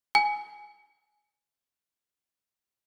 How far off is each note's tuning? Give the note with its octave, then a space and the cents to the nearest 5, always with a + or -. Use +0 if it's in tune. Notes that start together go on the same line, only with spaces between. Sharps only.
G#5 +5